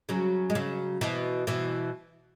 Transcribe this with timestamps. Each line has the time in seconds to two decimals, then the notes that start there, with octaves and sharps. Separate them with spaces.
0.09 C#3 F#3
0.50 G#3
0.55 C#3 F#3
1.01 B2 E3
1.47 B2 E3